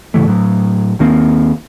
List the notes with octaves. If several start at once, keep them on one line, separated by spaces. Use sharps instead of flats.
G#2 C#3 E3 A3
A2 F#3
D#2 D#3 A#3 C4